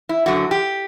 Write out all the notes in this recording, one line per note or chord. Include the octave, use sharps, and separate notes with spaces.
E4
F#2 D3 F#3 F#4
G4